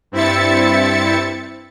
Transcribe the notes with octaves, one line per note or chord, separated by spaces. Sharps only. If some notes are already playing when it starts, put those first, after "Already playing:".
G2 C4 E4 E5 A6 C#7